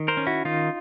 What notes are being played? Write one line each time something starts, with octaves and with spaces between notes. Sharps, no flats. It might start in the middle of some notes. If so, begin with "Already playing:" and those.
Already playing: D#3
A#4 C5
C#4
E4 F#4
D#3 D#4 F4